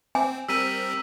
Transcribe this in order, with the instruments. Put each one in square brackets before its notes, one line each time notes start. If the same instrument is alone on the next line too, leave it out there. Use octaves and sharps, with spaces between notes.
[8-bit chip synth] C4 [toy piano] G#5
[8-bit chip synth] G3 C4 A#4 [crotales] E6 B6 D#7